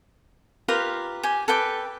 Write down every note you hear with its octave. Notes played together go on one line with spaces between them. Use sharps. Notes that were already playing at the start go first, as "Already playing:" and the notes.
F4 G4 A#4 B4
G4 G#5
A4 B4 G5 D6